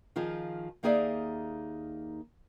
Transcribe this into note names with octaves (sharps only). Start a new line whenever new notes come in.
D#3 F3 F4 G#4
D#2 A#3 D#4 G#4 D5 E5